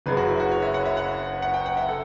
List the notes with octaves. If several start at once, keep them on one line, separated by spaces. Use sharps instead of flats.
F#1 F#2 C#3 B4
F#4
E4
F#4
C#5
E5
F#5
E5
F#5
F#5
G5
F#5
E5
A4